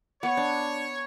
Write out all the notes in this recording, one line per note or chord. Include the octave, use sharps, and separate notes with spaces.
B3 C#5
D4